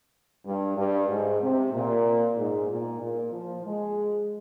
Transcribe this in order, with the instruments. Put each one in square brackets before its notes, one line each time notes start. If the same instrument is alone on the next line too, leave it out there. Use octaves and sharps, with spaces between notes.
[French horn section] G2
G2
G#2
C3
A#2
G#2
A#2
A#2
F3
G#3